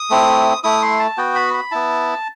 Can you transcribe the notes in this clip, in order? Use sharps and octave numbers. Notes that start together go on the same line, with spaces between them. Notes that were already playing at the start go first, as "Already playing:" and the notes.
Already playing: D#6
A3 C4 E4
A3 E4 D#6
C6
A5
B3 F#4 G5
B5
B5
B3 E4 A5